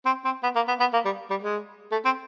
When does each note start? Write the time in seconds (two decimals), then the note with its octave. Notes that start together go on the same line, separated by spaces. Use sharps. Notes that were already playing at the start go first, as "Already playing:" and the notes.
0.05 C4
0.25 C4
0.43 B3
0.56 A#3
0.68 B3
0.80 B3
0.93 A#3
1.05 G3
1.30 G3
1.42 G#3
1.92 A3
2.05 C4